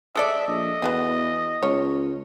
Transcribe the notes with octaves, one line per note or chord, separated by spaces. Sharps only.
G#3 A4 D5 E5
A#1 D#5
E2 B3 F#4 G#4
C#2 C#4 C#5